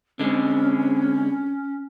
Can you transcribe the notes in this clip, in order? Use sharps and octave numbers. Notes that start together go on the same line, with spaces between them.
D3 G#3 C4 C#4